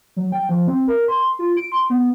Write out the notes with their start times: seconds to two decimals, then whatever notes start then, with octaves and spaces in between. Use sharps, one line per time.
0.16 F#3
0.32 G5
0.49 F3
0.67 C4
0.88 A#4
1.08 C6
1.39 F4
1.57 D7
1.72 C6
1.90 B3